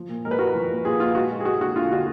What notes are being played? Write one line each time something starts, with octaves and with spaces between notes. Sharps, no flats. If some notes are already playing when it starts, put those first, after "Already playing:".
Already playing: F3
A#2
G#3 A#4
B4
G#3 F#4 A#4
F3
A#2
A#2 F4 G#4
A#2 F4
G#3 F#4
G#3
G#4
G#3 F#4
D3 F#4
D3 F4
D3 F#4